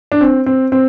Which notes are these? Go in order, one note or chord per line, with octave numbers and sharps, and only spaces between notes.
D4
C4
C4
C4